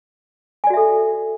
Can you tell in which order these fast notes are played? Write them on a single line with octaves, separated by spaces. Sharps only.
G#5 D5 F#4 E5 A4